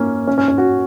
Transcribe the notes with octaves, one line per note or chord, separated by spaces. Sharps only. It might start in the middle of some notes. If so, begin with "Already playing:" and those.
Already playing: A#3 C#4
C#4
C#4
C#4
F#4